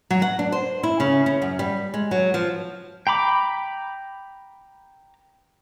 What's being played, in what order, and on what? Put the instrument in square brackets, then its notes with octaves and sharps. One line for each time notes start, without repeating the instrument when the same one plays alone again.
[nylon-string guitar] F#3
F#5
D4
C5
E4
C#3
C#4
F#2
G3
G#3
F#3
F3
[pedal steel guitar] G5 A#5 B5 D6